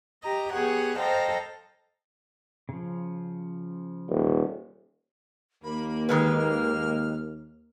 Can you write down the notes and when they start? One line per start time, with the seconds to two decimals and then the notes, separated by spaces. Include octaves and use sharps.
0.23 G4 D#5 A#5
0.52 B3 G4 G#4 C#5 F#5
0.97 A4 C5 D#5 F5 G5 A#5
2.69 C#3 F3
4.10 D#1
5.64 D#2 A#3 B5
6.09 D#3 G#3 B4 F6